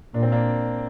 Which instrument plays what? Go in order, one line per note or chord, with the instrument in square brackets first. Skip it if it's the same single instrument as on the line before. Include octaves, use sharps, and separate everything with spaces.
[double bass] A#2 [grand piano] D4
[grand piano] C4
A#3 D4